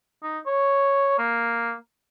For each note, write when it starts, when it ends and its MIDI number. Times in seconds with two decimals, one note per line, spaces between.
0.23 0.39 63
0.47 1.16 73
1.18 1.74 58